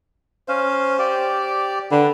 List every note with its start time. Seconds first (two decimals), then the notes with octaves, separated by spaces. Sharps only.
0.48 C#4 C5 F5
0.99 G4 D5
1.91 D3 B4